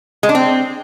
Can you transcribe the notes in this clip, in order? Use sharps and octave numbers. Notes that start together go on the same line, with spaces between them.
G#3
D4
C4